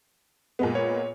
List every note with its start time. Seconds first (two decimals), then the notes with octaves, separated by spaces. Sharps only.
0.59 A#2 G#3 B3
0.75 C#5